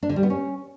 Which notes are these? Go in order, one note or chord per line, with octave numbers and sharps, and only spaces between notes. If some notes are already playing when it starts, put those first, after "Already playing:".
D4
D3
G3
B3
C#4